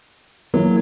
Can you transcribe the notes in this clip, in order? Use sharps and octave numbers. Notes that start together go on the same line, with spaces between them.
E3 F#3 A#3